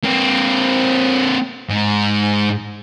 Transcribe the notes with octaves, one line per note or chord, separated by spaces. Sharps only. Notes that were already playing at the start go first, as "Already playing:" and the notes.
A#3 C4
G#2